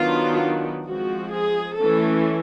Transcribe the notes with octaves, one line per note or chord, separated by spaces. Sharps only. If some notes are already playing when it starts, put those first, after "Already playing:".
Already playing: D#3 F#3 B3 D4 F4
F3 G#3 C4 F#4
G#4
E3 A3 C#4 A4